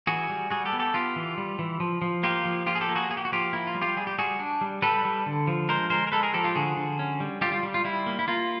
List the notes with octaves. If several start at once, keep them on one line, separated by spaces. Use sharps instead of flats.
E3 F#4 G#4
G3
G3 F#4 G#4
G4 A4
B3
G4 A4
B3 F4 G4
E3
G3
E3
F3
F3
A#3 F4 G4
F3
A#3 F4 G4
G#4
G4 A4
A#3
F#4 G#4
A#3 G#4
G4
F#4
F3 F4 G4
A#3 E4
F4
G3
F4 G4
G3 G#4
G4
G3 F#4 G#4
D4
G3
G3 A4 B4
G3
D3
F3
G#3 A#4 C5
G#3 A#4 C5
A#4
G#3 A4 B4
G#4 A#4
F3 G4 A4
F4 G4
D3 F#4 G#4
D3
C#4
G3
G3 F4 G4
F4
G3
F4
G3 E4
A#3
E4
A#3 F4